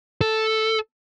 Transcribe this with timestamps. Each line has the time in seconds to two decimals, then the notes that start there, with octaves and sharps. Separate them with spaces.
0.21 A4